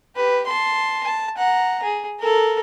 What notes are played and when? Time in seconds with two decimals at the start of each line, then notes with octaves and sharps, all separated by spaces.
0.16 G4 B4
0.47 A5 C6
1.03 A5
1.37 F#5 A#5
1.83 G#4
2.20 A4 A#4